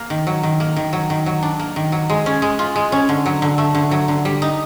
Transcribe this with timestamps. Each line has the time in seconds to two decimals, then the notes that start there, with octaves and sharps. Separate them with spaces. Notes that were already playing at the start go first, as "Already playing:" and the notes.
Already playing: A#3
0.10 D#3
0.27 F#3
0.43 D#3
0.60 A#3
0.76 D#3
0.93 F#3
1.10 D#3
1.26 F#3
1.43 D4
1.59 A#3
1.76 D#3
1.92 F#3
2.10 G#3
2.26 C#4
2.42 G#3
2.59 F4
2.76 G#3
2.92 C#4
3.09 D3
3.26 F#3
3.42 D3
3.58 A3
3.75 D3
3.91 F#3
4.08 D3
4.25 G3
4.42 D#4